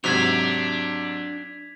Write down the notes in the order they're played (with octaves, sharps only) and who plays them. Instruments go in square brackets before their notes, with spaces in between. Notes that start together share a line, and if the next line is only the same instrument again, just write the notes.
[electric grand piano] G#2 C3 F#3 [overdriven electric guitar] D4 [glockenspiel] G#6 B6 F7